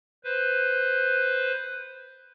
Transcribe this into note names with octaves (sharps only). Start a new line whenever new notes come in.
B4 C5